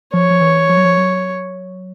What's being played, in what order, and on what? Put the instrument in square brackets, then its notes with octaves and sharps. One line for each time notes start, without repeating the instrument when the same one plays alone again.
[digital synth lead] F3 [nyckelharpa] C#5
[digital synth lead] F3
E3
F3
F#3
F3
F#3